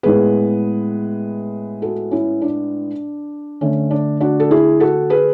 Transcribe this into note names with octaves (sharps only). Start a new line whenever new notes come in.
A2 G#3 B3 G#4 B4
F#4 A4
C#4 E4
D4
D3 A3 C#4
D4
D4 F#4
A4
E4 G#4
F#4 A4
G#4 B4